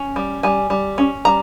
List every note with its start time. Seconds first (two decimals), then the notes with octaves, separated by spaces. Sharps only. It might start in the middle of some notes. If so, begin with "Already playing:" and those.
Already playing: C#4
0.16 G3
0.43 G3 G#5
0.70 G3
0.98 C#4
1.25 G3 A#5